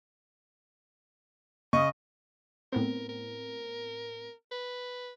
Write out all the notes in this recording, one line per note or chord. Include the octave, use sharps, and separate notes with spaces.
C#3 D#5 C#6
A2 B3 C4 A#4
A#4
B4